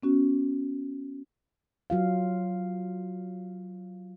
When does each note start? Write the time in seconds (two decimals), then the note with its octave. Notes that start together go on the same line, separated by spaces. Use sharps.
0.03 B3 C#4 F#4
1.90 F#3 F4 F5